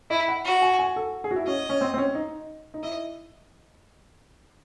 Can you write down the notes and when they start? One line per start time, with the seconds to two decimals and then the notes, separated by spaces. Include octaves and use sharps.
0.10 E4 D#5
0.28 F#5
0.45 F#4
0.62 G#5
0.79 G#5
0.96 A4
1.24 G#4
1.31 F#4
1.36 E4
1.47 C#4 D#5
1.69 C#4
1.81 C4
1.94 C4
1.98 C#4
2.15 D#4
2.74 D#4
2.83 E4 D#5